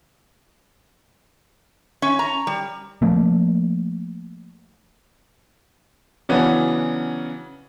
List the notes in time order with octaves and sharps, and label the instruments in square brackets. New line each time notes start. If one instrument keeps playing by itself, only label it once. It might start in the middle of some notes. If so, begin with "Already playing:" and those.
[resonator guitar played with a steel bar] C#4
A#5
G3
[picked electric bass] F3 A3 A#3
[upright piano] C#3 E3 F#3 B3 C#4 D4